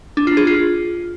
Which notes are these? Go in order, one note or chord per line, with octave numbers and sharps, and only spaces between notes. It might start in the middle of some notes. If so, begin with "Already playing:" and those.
D4
F4
G#4
F4